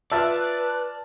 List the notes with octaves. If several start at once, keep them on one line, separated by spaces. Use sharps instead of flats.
F4 B4 D5 E5 A5 E6 F6 A6